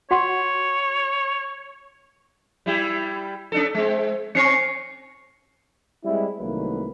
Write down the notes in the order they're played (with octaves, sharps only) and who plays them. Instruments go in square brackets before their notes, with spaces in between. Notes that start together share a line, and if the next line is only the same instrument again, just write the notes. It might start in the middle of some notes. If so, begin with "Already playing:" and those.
[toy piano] F#4 F#5 C6 [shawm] C#5
[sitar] G3 E4 G4
C#4 D4 A4
G#3 C4
[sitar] C4 C#4 [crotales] C#6 C7 C#7
[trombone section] G3 G#3 C4 E4
C2 D#3 F#3 A3 A#3 B4